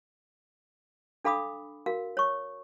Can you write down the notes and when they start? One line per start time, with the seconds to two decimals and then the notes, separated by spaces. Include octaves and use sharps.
1.25 D4 A4 F5 B5 D6 D#6
1.86 F#4 A#4 F5
2.17 C#5 C#6